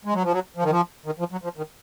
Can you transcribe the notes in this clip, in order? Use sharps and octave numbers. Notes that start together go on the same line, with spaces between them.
G#3
F#3
F3
F#3
F3
D#3
F3
D#3
F3
F#3
F3
D#3